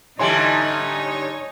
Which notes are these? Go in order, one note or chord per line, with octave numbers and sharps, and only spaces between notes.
D3 E3 G3 D#4 G4 C#5 G#5 C6